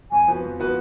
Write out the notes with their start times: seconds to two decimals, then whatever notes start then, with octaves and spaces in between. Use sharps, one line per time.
0.11 F2 G#5
0.28 F3 B3 F#4 B4
0.44 F2
0.59 F3 B3 F#4 B4